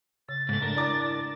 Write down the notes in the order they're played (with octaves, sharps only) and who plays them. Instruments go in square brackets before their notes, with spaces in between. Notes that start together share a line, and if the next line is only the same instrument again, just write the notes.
[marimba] C#3 [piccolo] A6
[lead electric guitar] G#2 A3 [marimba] G#3
[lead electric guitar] D4 A#4
[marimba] E4 A#5 [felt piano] D5 D6